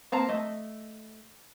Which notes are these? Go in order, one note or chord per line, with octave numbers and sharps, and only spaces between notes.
A#3 C4 A5 A#5
A3 D#5